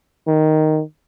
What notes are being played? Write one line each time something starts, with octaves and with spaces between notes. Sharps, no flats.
D#3